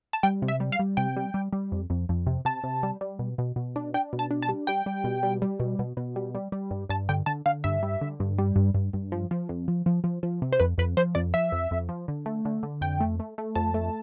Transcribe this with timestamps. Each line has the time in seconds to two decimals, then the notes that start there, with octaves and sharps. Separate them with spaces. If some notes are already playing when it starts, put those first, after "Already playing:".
0.13 A5
0.23 G3 G5
0.42 C3
0.48 E5
0.60 G3
0.72 F5
0.79 G3
0.97 C3 G5
1.16 G3
1.34 G3
1.53 G3
1.72 F2
1.90 F2
2.09 F2
2.27 C3
2.45 C3 A5
2.64 C3
2.83 G3
3.01 G3
3.19 B2
3.38 B2
3.56 B2
3.76 D4
3.94 D4 G5
4.13 B2
4.19 A5
4.31 D4
4.42 A5
4.49 G3
4.67 G3 G5
4.86 G3
5.04 B2
5.23 G3
5.42 G3
5.60 B2
5.79 B2
5.97 B2
6.16 G3
6.35 G3
6.52 G3
6.71 G2
6.89 G2 A5
7.09 D3 G5
7.26 D3 A5
7.46 D3 F5
7.64 G2 E5
7.83 G3
8.01 D3
8.20 G2
8.38 G3
8.56 G2
8.74 G2
8.93 G2
9.12 F3
9.31 F3
9.49 F2
9.68 F3
9.86 F3
10.04 F3
10.23 F3
10.42 C3
10.52 C5
10.60 F2 B4
10.78 F2 B4
10.97 F3 C5
11.15 F2 D5
11.34 F3 E5
11.52 F2
11.71 F2
11.89 F3
12.08 D3
12.26 A3
12.45 D3
12.63 D3
12.81 F2 G5
13.00 A3
13.20 A3
13.38 A3
13.55 F2 A5
13.74 A3